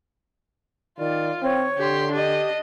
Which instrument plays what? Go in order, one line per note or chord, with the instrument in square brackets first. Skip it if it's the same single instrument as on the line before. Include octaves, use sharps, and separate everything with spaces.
[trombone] D#3 [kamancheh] F4 [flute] D5
[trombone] C4 [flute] C#5
[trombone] D3 [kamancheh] G4 C6
[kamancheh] D4 D#5 [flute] G4